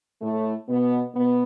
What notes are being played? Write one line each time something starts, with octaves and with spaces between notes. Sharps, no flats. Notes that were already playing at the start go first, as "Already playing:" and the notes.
A2 A3
B2 B3
B2 B3